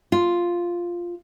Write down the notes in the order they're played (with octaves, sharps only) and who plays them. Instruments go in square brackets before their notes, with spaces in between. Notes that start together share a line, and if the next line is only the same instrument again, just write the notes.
[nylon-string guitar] F4